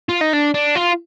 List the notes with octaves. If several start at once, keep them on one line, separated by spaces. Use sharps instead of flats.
F4
D#4
D4
D4
F4